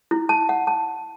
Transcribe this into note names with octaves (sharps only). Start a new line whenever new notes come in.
E4
A5
F#5
A5